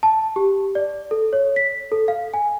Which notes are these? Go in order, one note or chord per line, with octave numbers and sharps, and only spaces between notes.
A5
G4
D5
A4
C#5
B6
A4
F5
G#5